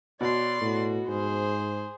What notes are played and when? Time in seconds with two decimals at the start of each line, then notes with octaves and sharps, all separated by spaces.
0.21 B2 C#5 D5 C6
0.61 A2 F#4
1.08 G#2 G#4 C5